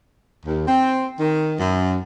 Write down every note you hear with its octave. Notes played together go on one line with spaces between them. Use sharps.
D#2
C4
D#3
F#2